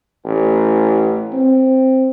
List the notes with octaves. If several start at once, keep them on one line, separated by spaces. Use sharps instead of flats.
A1
C4